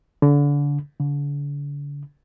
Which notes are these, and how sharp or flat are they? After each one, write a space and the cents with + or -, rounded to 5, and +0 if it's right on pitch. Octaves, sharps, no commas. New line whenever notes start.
D3 -30
D3 -40